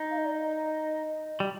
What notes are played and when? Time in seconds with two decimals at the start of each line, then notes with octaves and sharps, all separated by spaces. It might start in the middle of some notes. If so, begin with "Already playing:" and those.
Already playing: D#4
0.11 F5
0.18 D#5
0.25 D5
0.32 D#5
1.40 G3